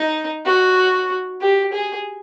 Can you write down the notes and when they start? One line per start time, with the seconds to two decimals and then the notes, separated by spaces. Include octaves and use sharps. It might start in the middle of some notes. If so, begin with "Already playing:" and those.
Already playing: D#4
0.46 F#4
1.41 G4
1.72 G#4